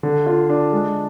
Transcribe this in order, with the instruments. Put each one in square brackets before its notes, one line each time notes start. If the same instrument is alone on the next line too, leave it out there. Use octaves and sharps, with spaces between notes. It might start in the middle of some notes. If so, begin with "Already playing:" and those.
[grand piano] D3
F4
D4
G#3